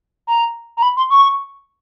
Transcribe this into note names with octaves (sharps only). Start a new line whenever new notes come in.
A#5
A#5
B5
C6
C#6